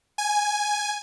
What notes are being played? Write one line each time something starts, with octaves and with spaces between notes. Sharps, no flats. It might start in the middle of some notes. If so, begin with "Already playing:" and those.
G#5